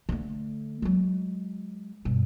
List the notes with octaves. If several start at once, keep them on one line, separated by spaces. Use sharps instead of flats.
D3 A3
F#3 G#3
G2 B2